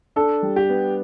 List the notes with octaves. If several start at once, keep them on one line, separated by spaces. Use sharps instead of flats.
D4 A4
G3
G4
B3